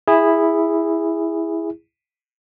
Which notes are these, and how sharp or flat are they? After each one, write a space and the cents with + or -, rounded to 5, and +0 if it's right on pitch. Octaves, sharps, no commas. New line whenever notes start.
E4 +0 G#4 -15